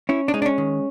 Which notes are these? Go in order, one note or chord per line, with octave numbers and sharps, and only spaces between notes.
C#4 E4
D4
G#3 D#4
D4
C#4
D#3